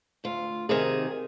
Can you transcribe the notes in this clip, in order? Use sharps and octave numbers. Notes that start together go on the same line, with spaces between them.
D2 F4
C3 D#3 G#4